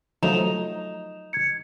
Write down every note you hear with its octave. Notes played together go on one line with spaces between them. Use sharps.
F3 F#3 A3 D#4 E7 F7
G#6 C#7